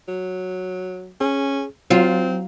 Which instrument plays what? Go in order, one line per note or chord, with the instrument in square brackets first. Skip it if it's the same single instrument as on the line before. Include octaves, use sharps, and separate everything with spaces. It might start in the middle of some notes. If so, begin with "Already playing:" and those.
[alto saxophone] F#3
[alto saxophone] C#4 [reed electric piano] G#4
[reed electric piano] F#3 [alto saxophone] C4 [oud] F4